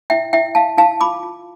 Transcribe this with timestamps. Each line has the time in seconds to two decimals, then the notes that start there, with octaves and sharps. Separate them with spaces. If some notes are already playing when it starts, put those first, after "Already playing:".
0.10 E4 E5 G5
0.33 E4 E5 G5
0.55 E4 F5 A5
0.77 E4 F5 A5
1.01 F4 B5 D6
1.23 F4